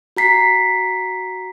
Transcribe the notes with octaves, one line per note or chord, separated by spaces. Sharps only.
F#4 A#5 B6 C7